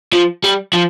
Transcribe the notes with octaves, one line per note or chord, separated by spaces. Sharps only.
F3
G3
F3